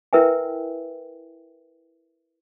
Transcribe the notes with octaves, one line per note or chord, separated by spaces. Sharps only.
E4 A#4 B4 E5 G5 G#5